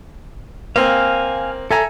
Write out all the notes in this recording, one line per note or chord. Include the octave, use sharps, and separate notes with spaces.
A#3 C4 F5 G#5
A4 E5 G#5 A#5